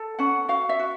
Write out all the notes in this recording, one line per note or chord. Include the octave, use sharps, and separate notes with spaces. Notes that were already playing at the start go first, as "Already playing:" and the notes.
Already playing: A4
C#4 F#5
F#4 F5
E5
F#4